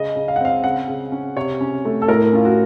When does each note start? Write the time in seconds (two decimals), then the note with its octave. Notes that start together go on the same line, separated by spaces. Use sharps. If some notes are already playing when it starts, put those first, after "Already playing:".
Already playing: C#3 D#5
0.16 C#3
0.28 F5
0.36 F#5
0.40 C4 F5
0.64 C#3 F#5
0.88 C#3
1.12 C#4
1.36 C3 C#5
1.61 C#4
1.85 A3
2.02 A4
2.08 A2 A#4
2.33 C#4 F4
2.45 F#4